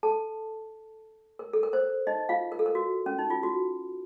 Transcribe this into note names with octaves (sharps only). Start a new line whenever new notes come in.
A4 A5
A#4
A4
A#4
C5
D#4 D#5
F4 F5
A#4
A4
A#4
F#4
C#4
D#4
F4
F#4